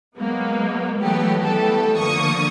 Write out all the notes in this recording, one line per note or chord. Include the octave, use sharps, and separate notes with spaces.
F#3 G#3 A#3 B3
E3 F#3 A3 B3 G4
E3 G3 A3 B3 G4 A4
D3 F3 A#3 C#6 D#6